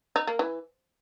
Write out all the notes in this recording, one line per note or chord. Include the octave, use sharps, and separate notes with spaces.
D#4
A#3
E3